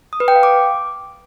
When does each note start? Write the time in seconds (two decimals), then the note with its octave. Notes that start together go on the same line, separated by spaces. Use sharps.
0.13 D#6
0.20 B4
0.28 G5
0.36 F5
0.43 D6